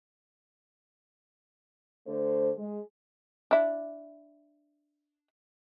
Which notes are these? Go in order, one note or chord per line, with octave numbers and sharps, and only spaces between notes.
D3 A3 C5
G#3
D4 E4